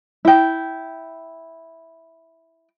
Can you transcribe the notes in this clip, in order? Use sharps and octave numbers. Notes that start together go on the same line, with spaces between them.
E4 G5